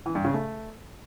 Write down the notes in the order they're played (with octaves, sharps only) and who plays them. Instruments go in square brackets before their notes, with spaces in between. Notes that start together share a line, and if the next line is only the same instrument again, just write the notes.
[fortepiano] E3
G2
C#3
A3